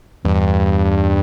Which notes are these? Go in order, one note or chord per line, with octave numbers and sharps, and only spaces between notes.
E2 G2